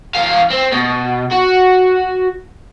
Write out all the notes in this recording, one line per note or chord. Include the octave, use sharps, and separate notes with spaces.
E2 F5
C4
B2
F#4